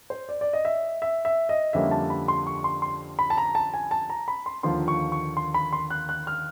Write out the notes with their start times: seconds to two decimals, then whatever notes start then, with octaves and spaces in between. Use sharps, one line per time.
0.10 C5
0.29 D5
0.41 D5
0.53 D#5
0.65 E5
1.02 E5
1.25 E5
1.49 D#5
1.73 F2 D3 G3 A#3 C#4 E5
1.91 A5
2.10 B5
2.28 C6
2.47 C#6
2.64 C6
2.82 C6
3.19 B5
3.30 A5
3.38 A#5
3.55 A5
3.74 G#5
3.91 A5
4.10 A#5
4.28 B5
4.46 C6
4.63 D#2 D3 F3 C6
4.88 C#6
5.12 C#6
5.37 C6
5.54 B5
5.72 C6
5.90 F#6
6.09 F#6
6.27 F6